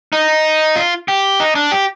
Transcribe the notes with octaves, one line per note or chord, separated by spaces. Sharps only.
D#4
F4
G4
D#4
D4
G4